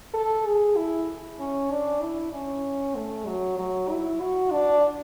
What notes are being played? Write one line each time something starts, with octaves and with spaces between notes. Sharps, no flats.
A4
G#4
E4
C#4
D4
E4
C#4
A3
F#3
F#3
E4
F#4
D4